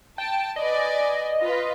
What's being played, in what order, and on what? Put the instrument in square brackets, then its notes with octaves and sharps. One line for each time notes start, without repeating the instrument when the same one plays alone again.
[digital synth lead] G5 [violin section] A5
[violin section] B4 D5 G#5 [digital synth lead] D#5
[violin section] F4 B4